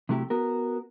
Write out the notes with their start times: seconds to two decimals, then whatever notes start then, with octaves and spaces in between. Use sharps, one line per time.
0.09 C3 F#3 A3 E4 G4
0.30 B3 F#4 A#4